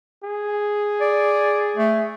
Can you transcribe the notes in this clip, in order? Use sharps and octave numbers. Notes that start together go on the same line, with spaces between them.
G#4
D5
A3